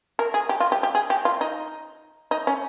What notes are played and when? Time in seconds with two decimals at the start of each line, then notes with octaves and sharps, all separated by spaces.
0.19 A#4
0.34 G#4
0.49 G4
0.60 F4
0.72 G4
0.83 G4
0.95 G#4
1.10 G4
1.25 F4
1.41 D#4
2.31 D#4
2.47 C#4